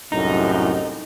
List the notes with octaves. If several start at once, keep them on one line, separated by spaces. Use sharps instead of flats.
C2 F#2 A2 D#4